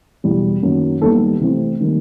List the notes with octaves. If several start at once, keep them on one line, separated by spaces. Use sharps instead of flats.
E2 B2 G3
F#2 D#3 F#3 A#3 C#4
D#2 D#3 G3 B3 A4
C3 E3 A3 C4
D#3 G3 A#3